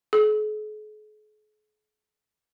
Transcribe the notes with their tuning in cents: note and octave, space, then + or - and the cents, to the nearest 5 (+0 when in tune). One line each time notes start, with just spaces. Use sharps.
G#4 +45